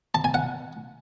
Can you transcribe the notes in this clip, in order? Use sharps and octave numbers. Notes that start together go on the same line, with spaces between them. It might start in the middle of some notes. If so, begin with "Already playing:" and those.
A5
G#5
F#5